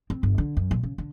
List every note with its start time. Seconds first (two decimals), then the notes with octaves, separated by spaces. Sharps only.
0.10 C4
0.23 G1
0.38 D3
0.57 F#2
0.71 A#2
0.83 C#3
0.98 D3